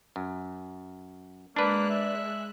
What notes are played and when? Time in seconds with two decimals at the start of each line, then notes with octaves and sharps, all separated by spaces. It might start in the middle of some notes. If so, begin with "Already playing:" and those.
0.16 F#2
1.56 G#3 A#3 D4 B4 D5 F#6
1.90 E5